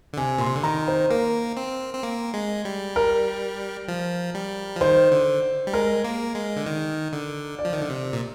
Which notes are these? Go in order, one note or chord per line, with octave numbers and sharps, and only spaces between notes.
D3
C3 G#5
A#2 C6
C3
D3
D#3 A#5
C5
A#3 A#4
C4
C4
A#3
G#3
G3
A#4
F3
G3
F3
D#3 C5
D3
G3
G#3 A#4
A#3
G#3
D3
D#3
D3
D5
F3
D#3
D3
C3
A#2